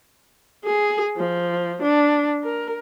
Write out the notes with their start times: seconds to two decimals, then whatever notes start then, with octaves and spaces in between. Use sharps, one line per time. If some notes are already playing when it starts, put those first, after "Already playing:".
0.65 G#4
1.17 F3
1.82 D4
2.44 A#4